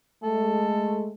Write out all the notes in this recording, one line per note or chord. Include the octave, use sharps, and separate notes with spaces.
G#3 A3 A4